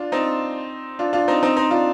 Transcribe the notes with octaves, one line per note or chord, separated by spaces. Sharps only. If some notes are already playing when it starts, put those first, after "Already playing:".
Already playing: D4 F4
C4 D#4
D4 F4
D4 F4
C4 D#4
C4 D#4
C4 D#4
D4 F4